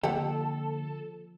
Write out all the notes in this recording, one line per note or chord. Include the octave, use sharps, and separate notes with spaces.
D3 F3 A#3 G4 A4 F#5